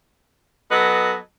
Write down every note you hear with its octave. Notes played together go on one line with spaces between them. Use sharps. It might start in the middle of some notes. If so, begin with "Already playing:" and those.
F#3 B3 A4 D#5